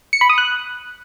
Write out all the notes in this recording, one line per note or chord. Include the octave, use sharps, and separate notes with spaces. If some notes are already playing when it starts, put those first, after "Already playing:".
C#7
B5
D#6
F#6